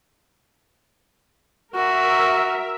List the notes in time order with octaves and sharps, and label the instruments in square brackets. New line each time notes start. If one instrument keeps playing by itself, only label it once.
[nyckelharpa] F#4 [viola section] A#4 E5